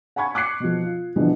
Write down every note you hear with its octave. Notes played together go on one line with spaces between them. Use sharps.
F#5 G#5 B5 C#6 G#6
C#6 D6 F#6 G#6 C7 C#7
B2 F3
F4
B2 D3 E3 F3